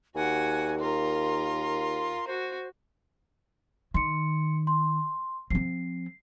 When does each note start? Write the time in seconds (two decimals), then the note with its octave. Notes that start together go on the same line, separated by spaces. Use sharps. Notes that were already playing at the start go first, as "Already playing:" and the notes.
0.15 D#2 F#4 F#5 G#5
0.80 F4 A#4 C6
2.27 F#4 C5
3.94 D#3 C6 C#7
4.67 C6
5.50 F3 C4 C7